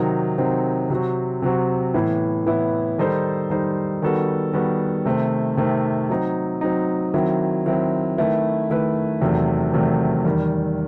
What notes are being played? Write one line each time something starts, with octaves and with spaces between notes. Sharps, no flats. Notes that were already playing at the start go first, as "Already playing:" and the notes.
Already playing: C3 D#3 F#3 C4 D#4
C3 D#3 F#3 C4 D#4
C3 F#3 C4 F#4
C3 F#3 C4 F#4
A2 E3 B3 E4
A2 E3 B3 E4
D#3 G3 D#4 A4 C5
D#3 G3 D#4 A4 C5
D#3 G3 B3 F#4 A4
D#3 G3 B3 F#4 A4
C3 D#3 A3 C4
C3 D#3 A3 C4
F#3 C4 D#4
F#3 C4 D#4
D#3 F#3 C4 E4
D#3 F#3 C4 E4
D#3 A3 E4 B4
D#3 A3 E4 B4
E2 C3 D#3 F#3 A3
E2 C3 D#3 F#3 A3
E2 D#3 G3